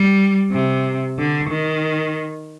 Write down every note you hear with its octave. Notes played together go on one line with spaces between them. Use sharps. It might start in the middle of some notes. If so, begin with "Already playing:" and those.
Already playing: G3
C3
D3
D#3